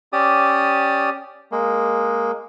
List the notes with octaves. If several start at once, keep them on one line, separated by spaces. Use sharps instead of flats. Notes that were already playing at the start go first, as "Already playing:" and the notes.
C#4 G4 D5 D#6
G#3 A#3